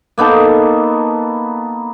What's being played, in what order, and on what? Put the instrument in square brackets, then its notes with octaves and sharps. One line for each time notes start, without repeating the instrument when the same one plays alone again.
[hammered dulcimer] A#3 B3 D#4 A4